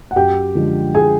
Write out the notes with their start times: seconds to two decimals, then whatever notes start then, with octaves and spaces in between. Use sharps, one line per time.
0.11 F#5
0.16 F#2 G4 G5
0.55 D3 F3 G#3
0.95 G#4 G#5